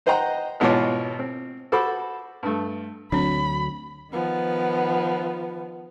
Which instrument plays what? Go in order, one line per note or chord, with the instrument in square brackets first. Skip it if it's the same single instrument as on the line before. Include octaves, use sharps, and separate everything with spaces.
[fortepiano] D#4 C5 D#5 F#5 G5 A#5
G#1 B2 E3 F4 C#5 D6
C4
F#4 A4 C5 A5 B5 D6
G2 A3
[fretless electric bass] D2 F#3 [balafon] C4 D4 [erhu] B5
[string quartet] D#3 F3 B3